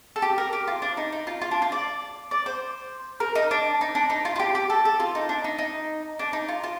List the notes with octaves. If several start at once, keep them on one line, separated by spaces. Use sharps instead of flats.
A4
G4
A#4
G4
F4
D4
D#4
D#4
F4
F4
D4
F4
D5
D5
C5
A#4
D#4
D4
D#4
D4
D#4
F4
F4
G4
G4
A4
A4
F4
D#4
D4
D#4
D#4
D4
D#4
F4
F4